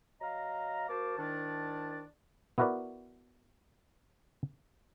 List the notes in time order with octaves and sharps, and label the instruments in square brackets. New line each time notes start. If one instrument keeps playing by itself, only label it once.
[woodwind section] F#3 D#5 F5 A#5
A#3 F#4 A#4 C5 A5 D6
G#2 D#3 D4 E4 D5 A5
[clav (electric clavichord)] B3 E4 F#4 A#4 B4 D5